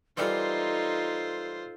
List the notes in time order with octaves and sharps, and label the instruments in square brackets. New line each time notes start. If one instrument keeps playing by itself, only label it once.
[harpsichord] E3 G3 A#4 [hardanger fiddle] D#4 [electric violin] F4 C5 [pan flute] A4